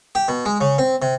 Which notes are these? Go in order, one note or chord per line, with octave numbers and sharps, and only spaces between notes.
G4
B2
G#3
C#3
C4
C3